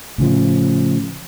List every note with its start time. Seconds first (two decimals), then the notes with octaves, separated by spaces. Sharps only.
0.18 A2 C#3 F3